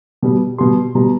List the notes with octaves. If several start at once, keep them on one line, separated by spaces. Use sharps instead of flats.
B2 G3
B2 G3 C6
B2 G3 A#5